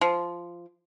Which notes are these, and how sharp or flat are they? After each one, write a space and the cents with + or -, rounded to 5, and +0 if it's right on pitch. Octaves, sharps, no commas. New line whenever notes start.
F3 -10